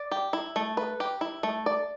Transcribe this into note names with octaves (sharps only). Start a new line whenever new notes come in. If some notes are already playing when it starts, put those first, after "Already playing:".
Already playing: D5
G4
E4
A3
B4
G4
E4
A3
D5